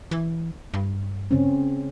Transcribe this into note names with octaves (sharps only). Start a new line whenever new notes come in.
E3
G2
C#3 C4 C#4